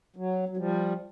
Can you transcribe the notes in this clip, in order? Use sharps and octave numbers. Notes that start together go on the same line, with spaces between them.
F#3
F#3
F3 G3